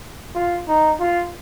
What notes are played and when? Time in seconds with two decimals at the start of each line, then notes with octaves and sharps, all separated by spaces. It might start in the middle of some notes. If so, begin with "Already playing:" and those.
0.35 F4
0.68 D#4
1.00 F4